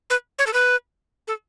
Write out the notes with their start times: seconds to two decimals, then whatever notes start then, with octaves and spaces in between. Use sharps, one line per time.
0.10 B4
0.39 C#5
0.47 A4
0.53 B4
1.28 A4